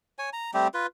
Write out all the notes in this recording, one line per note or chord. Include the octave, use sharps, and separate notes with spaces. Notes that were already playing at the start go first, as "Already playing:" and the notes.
C#5 G#5
A#5
G3 A3 C4 G4
F4 B4